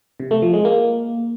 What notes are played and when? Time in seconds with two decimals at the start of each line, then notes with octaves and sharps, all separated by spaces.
0.20 C3
0.31 A3
0.42 F3
0.54 G#3
0.65 A#3